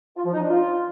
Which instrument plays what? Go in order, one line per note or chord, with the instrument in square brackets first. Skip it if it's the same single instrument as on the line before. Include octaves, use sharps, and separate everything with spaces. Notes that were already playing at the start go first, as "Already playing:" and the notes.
[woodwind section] F4
F3
D#4
D4
F4